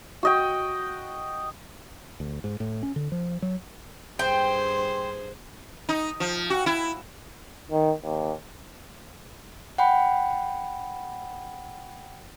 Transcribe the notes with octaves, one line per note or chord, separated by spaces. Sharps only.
F#4 D#5 G5
D2
G#2
A2
C#4
D3
F3
F#3
G2 G#4 C5 G5 C6
D#4
F3
F#4
E4
D#3
D#2
F#5 G5 B5